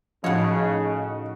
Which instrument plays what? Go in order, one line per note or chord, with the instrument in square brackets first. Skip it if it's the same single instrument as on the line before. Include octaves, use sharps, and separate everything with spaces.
[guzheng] A2 C#5 [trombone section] C#3 [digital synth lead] F3 [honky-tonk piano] D#4 F#4